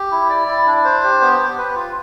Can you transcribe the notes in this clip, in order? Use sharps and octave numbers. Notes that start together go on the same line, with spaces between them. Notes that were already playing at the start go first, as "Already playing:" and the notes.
Already playing: G4
E4
D5
E4
D4
C5
G4
B3
B3
B4
F4